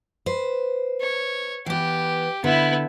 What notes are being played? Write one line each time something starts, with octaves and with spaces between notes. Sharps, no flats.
B4 C5
C#5
E3 B3 G4
D3 B3 E4